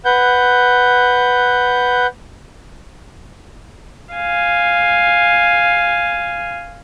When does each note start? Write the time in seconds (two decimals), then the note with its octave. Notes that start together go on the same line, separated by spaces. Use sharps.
0.05 B4 F#5 G6
4.14 F5 G#5